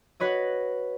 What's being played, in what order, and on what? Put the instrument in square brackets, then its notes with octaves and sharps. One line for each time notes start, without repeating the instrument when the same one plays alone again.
[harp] F#4 B4 C#5 D#5